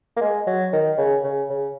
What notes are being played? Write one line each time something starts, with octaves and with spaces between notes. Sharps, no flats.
A#3
G#3
F#3
D#3
C#3
C#3
C#3